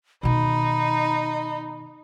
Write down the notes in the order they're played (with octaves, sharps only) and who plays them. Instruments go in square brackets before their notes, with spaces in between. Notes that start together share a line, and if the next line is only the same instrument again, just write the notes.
[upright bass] B2 D#3 [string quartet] D#4 [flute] B5